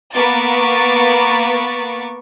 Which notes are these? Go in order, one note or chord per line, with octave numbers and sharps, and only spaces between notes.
A#3 B3 B4 C#6 D6 A6